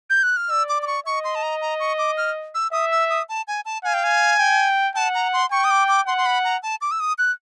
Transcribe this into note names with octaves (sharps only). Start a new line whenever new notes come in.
G6
F#6
F6
D5 E6
D6
D6
C#6
D#5 C#6
C6
A5
A#5
A#5
C#6
D6
F6
E6
E5 D#6
E6
D#6
A5
G#5
A5
F5 G#5
G5
G#5
G5
F#5 A5
A#5
C6
G5 C#6
D#6
D6
D6
F#5 C6
C6
B5
A#5
A5
D6
E6
D#6
F#6